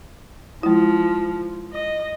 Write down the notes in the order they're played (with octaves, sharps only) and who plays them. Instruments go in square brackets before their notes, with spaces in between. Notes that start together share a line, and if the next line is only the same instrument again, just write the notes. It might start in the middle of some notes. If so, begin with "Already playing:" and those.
[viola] F3 [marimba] G#3 E4
[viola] D#5